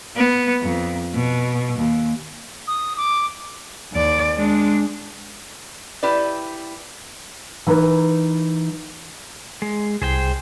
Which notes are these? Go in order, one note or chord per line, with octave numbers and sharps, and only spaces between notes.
B3
F2
B2
D#2
D#6
D6
D#2 D5
G#3 D4
E4 G4 B4 D5
E3 D#4 E4 A#4 B4
G#3
C2 G#4 C5 G5